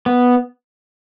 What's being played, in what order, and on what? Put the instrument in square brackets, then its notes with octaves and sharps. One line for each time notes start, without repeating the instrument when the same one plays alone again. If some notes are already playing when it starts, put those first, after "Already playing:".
[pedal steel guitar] B3